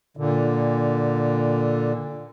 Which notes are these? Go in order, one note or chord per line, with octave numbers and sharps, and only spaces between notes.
A#2 D3